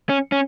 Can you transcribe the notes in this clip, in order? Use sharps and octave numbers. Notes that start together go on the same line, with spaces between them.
C#4
C#4